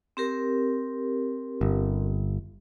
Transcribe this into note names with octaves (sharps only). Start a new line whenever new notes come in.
C4 G4 A#4
G1